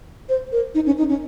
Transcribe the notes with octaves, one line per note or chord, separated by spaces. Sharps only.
C5
A#4
D#4
C#4
D#4
C#4